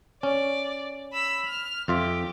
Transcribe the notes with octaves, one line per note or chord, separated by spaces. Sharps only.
C#4 D5
B5 E6
F6
F2 F4 G4 E5